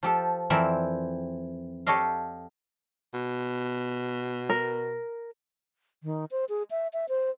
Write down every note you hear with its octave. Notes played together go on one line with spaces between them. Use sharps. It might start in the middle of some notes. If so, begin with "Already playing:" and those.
F3 G4 A4
F2 E3 C4 A#4 D5 E5
G4 A4 C#5 D#5 F5
B2
A#4
D#3
C5
G#4
E5
E5
C5